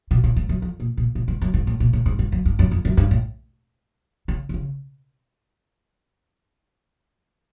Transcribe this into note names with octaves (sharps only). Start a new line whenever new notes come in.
B2
A2
G#2
F#2
F2
A#2
A#2
A2
G2
F#2
G#2
A2
A#2
A2
G#2
G2
F#2
G2
F#2
F2
F#2
G2
A2
C#3
C3
C#3